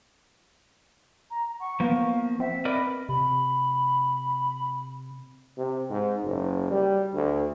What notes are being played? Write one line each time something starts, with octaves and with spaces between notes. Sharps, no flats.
A#5
F#5 C#6
F3 A#3 B3 F5
C4 E5 F#5
A#4 B4 D5 D#5 B5
C3 B5
C3
G#2
F#1
G3
D2